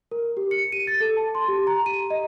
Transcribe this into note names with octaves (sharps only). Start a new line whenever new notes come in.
A#4
G4
C#7
D#7
A6
A4
A5
C6
G4
A#5
D#7
D#5